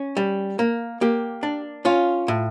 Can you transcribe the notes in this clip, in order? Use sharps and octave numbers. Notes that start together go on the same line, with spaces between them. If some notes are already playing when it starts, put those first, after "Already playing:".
Already playing: C#4
G3
A#3
A#3 G4
D4
C#4 F4
A2